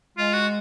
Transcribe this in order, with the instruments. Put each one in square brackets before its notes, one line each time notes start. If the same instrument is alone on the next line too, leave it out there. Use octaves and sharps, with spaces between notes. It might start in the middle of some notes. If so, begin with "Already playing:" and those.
[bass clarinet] G#3 [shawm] F4
[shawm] F#4